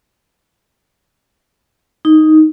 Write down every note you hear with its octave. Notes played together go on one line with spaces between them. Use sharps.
D#4